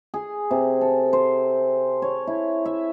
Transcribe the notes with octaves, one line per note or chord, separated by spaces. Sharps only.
G#4
C3
A4
C5
C#5
E4
E5